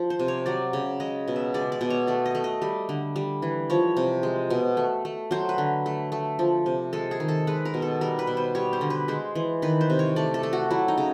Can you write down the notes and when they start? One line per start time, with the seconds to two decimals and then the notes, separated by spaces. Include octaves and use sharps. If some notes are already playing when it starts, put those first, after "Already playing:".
Already playing: F3
0.10 C5
0.20 C3
0.28 C#5
0.46 F#3 D5
0.73 C#3
1.00 G#3 D#5
1.28 B2
1.36 E5
1.54 G#3 D5
1.72 D5
1.81 B2
1.90 C#5
2.07 A3 D5
2.26 D#5
2.35 A3
2.44 D#5
2.62 G3
2.89 D3
3.16 G3
3.42 E3
3.70 F3 C#5
3.97 C3
4.23 G#3
4.50 B2
4.77 A3
5.05 A3
5.31 F#3 C5
5.49 B4
5.58 D3
5.86 A3
6.12 A3
6.39 F3
6.66 C3
6.93 G#3 A4
7.11 G#4
7.20 D#3
7.28 A4
7.47 G#3 B4
7.65 A#4
7.74 B2
7.82 A4
8.01 G3 A#4
8.19 B4
8.27 B2
8.37 C5
8.55 G3 C#5
8.73 C5
8.81 D3
8.90 B4
9.08 G#3 C5
9.35 E3
9.62 D#3 B4
9.81 C5
9.90 C3
9.99 C#5
10.16 A3 D5
10.34 A4
10.43 A3
10.53 F#4
10.71 F#3 E4
10.88 D#4
10.98 C#3